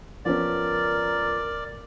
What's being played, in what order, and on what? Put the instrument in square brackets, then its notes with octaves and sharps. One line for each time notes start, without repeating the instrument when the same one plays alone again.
[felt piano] F3 B3 C#4 [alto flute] A#4 [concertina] D5